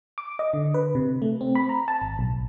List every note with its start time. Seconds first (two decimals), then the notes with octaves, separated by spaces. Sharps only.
0.18 D6
0.39 D#5
0.54 D3
0.74 B4
0.95 C3
1.22 A3
1.41 C4
1.55 B5
1.69 A#5
1.88 A5
2.02 G#1
2.19 B1